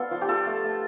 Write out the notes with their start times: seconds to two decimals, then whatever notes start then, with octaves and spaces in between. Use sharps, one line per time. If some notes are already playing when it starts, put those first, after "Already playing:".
Already playing: B3 D4 F4 A4
0.11 F3
0.21 G4
0.28 F4 A4
0.46 A3
0.64 A3